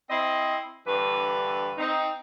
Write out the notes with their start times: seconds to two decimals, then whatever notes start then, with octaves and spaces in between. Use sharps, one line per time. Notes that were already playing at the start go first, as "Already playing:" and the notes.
0.10 C4 E4 C5 D#5
0.87 G2 D3 E3 B4
1.78 C4 D#4